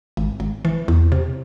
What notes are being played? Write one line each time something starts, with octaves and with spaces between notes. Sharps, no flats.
G#1
G#1
E3
E2
C3